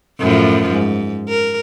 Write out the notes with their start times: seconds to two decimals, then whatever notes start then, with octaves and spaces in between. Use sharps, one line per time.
0.19 F#2 A2 F3
0.70 G#2
1.29 A#4